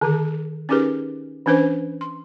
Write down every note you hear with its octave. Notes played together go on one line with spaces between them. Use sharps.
D3 D#3 G#4
C#4 D#4 G4 G#4 A#4 B4
E3 C#4 D4 B4 C5
C6